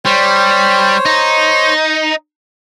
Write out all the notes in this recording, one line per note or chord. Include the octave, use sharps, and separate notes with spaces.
G3 C5 C#5
D#4